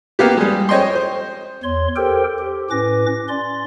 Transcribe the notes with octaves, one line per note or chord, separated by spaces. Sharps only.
A#3 B3 G4
G3 G#3
C5 C#5 D#5 G5 C6
C5
E2 C#5 C6
G4 A4 A#4 C5 G5
G4
A2 C#4 B4 D6 A#6
C#4 D5 C6